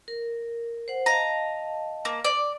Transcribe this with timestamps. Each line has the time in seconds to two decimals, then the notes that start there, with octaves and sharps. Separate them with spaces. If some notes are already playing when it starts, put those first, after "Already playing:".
0.08 A#4
0.88 C5 F#5
1.06 D#5 F5 A5 A#5
2.05 A#3
2.25 D5